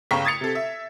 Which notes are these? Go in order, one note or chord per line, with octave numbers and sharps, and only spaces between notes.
G1 C#3 G5 A#5 C#6 B6
D#6 G#6 A6 C7 C#7 F7
C3 A4
E5